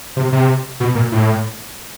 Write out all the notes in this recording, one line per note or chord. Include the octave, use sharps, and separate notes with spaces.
C3
C3
B2
A#2
A2